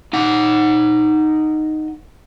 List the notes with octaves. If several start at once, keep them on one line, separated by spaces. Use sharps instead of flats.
D#4 F#5